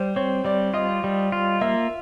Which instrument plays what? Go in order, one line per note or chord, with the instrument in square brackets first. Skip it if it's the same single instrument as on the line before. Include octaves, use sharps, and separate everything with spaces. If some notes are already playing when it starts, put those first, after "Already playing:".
Already playing: [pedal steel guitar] G3 [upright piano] C5
[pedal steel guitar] C4 [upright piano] C#5
[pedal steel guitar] G3 [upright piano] D5
[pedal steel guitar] F4 [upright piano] D#5
[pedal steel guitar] G3
F4
[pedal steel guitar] A#3 [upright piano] E5